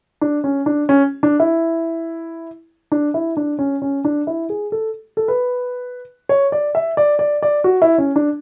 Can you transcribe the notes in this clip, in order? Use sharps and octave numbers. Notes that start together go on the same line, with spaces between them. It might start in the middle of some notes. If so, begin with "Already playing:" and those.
D4
C#4
D4
C#4
D4
E4
D4
E4
D4
C#4
C#4
D4
E4
G#4
A4
A4
B4
C#5
D5
E5
D5
D5
D5
F#4
E4
C#4
D4